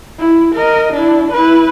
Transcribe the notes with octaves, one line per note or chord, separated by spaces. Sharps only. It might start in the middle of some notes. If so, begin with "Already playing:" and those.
E4
A#4 D#5
D4 E4
E4 B4